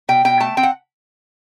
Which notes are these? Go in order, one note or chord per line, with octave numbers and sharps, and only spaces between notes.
B2 G5
B2 G5
A3 A5
C4 G5
F#5